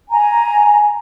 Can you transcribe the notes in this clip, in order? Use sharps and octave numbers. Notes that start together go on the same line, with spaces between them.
G#5 A#5